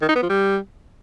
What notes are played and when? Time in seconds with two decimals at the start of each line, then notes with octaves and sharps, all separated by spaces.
0.02 D#3
0.09 D#4
0.16 B3
0.22 F3
0.29 G3